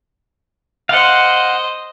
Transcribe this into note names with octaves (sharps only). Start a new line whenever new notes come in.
C5 D#5 F5 F#5